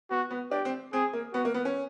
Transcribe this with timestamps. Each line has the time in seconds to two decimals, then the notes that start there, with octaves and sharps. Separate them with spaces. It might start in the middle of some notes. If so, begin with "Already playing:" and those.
0.10 B3 F#4
0.30 B3
0.51 D4 G4
0.65 C4
0.93 C4 G#4
1.13 A#3
1.33 B3 F#4
1.45 A#3
1.54 B3
1.65 C#4